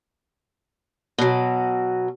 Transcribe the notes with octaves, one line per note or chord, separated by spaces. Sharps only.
B2 F#3